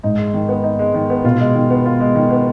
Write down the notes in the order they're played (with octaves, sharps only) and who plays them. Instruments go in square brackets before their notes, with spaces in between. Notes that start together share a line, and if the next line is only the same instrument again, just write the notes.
[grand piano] G#2 [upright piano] D#4
[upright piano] G#3
D#3
B3
D#4
G#3
D#3
B3
[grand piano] B2 [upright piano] F4
[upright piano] G#3
D#3
B3
F4
G#3
D#3
B3